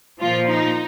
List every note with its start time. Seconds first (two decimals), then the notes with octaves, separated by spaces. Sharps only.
0.21 A#2 F3 F4
0.49 D#4